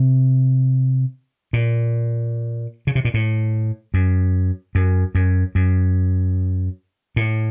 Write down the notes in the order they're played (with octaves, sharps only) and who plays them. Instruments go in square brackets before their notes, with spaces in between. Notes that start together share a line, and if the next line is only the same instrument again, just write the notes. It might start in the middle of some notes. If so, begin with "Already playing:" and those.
Already playing: [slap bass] C3
A#2
C#3
C3
A#2
A2
F#2
F#2
F#2
F#2
A2